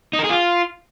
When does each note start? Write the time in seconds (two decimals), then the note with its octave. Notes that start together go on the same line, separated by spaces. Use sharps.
0.13 D#4
0.19 A#4
0.24 G#4
0.30 F4